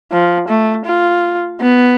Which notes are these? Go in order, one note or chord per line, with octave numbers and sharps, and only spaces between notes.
F3
A3
F4
B3